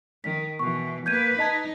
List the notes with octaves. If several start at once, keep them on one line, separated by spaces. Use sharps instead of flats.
D#3 B6
B2 E3 C#6
A#3 B4 G6 G#6 D#7
D#4 D#5 A5 G#6